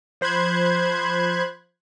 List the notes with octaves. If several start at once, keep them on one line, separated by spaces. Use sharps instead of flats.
F3 C5 B5 F#6 G#6